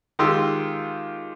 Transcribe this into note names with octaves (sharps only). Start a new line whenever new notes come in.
D#3 G#3 F4 G4 C6 E6